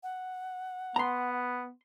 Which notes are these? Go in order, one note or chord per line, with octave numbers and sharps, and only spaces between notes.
F#5
B3 A#5 C6